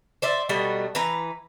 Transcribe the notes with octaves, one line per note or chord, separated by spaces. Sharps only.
C5 D5 E5
B2 F#3 G3 A3
E3 B4 A#5